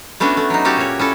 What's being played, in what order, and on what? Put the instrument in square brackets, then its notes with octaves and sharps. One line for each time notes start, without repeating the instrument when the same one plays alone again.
[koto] A3 B3 C#4 D4 F#4
A3
F#3 D#4
C#4 F#4 G4 A4 D5
A#2 C#5
C#4 E4 A4